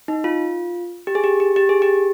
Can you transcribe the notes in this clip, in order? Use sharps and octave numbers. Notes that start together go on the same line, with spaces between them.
D#4
F4
G4
G#4
G4
G4
G4
G#4
G4